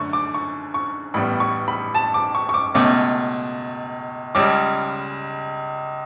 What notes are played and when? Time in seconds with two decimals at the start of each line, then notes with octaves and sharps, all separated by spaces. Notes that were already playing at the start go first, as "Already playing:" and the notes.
Already playing: F#2 D3 A3 C#4 C#6
0.13 D6
0.34 C#6
0.74 C#6
1.14 A1 A2 G3 B3 B5
1.40 C#6
1.68 B5
1.95 A5
2.14 D6
2.35 C#6
2.49 C#6
2.54 D6
2.74 C#2 B2 A3 C#4 D6
4.35 C#2 C#3 G3 C#4 D6